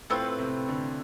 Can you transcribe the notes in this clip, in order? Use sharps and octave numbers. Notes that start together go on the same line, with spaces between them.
A2 A3 C4 F4 B4
C3
D3